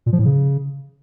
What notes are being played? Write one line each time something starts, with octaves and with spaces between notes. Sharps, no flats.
A#2
F3
A2
C#3